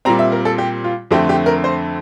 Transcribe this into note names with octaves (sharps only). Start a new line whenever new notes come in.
A#2 G3 C4 A#5
E5
A#4
A4
G4
F4
F2 D3 A3 C4 G4
G4
A#4
C5